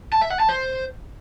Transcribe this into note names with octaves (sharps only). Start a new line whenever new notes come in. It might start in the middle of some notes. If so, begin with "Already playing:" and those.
A5
E5
F#5
A5
C5